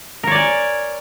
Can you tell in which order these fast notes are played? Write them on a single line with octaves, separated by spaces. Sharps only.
A#4 C#5 D5 G#5